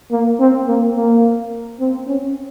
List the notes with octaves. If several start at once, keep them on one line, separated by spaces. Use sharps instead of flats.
A#3
C4
A#3
A#3
C4
C#4